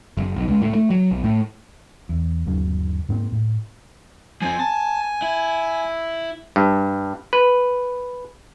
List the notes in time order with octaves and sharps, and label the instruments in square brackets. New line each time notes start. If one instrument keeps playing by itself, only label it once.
[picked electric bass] F#1
B1
C#2
A2
A3
F#3
B1
A2
[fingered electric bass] E2
G1 D#2 C#3 F#3
G#2 A#3 C4
A2
[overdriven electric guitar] F3 C4 [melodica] G#5
[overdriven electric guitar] A5
E4
[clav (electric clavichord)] G2
B4